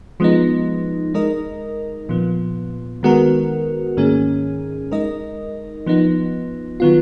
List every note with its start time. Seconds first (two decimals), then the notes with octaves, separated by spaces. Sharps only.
0.20 F3 G#3 B3 D#4
1.14 G#3 D#4 A#4 D#5
2.09 A#2 F3 B3
3.03 D#3 G#3 B3 F#4 A#4
3.97 G#2 D#3 A#3 C#4 G#4
4.91 G#3 D#4 A#4 D#5
5.86 F3 B3 D#4
6.80 D#3 F#3 B3 F4